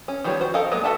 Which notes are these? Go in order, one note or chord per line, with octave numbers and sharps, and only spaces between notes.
C#4
D#3 F3 G3 B3 C#5
F#4 C5
A4 A#4 D#5 F5
F#3 G#3 A#3 B3
F#4 A4 E5 F#5 A5